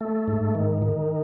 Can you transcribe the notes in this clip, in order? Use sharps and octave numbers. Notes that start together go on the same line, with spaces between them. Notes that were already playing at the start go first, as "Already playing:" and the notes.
A3
G#2
D#3
D#3